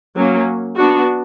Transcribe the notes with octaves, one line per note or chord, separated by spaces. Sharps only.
F#3 A#3 C#4
B3 D4 F#4